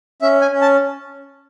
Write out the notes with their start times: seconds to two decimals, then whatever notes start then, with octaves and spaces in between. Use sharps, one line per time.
0.22 C#4 E5
0.41 G#5
0.51 C#4
0.61 A5